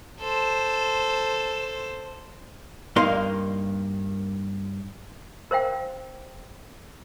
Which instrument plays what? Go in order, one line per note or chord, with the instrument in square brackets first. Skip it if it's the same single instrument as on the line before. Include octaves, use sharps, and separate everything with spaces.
[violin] A4 C5
[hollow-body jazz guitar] G2 A#3 D#4 C6
[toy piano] A#4 C5 F5 G5